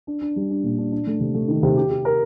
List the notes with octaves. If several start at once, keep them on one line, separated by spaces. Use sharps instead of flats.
D4
D4
G3
D4
A#2
D4
D4
A3
C3
A3
D#3
C3
G4
G4
A#4